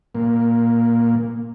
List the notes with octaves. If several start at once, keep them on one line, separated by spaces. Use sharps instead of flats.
A#2 A#3